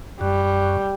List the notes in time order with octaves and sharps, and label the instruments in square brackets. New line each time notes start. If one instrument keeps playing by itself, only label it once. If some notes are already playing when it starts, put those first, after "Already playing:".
[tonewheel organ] F#2 [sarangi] G3